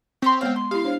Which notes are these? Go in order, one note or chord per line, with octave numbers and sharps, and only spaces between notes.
C4 G4 C#5 C6 C#6
G#3 B3 C#5 F5 G5
C6
E4 G4 F5
D4 C5 C#5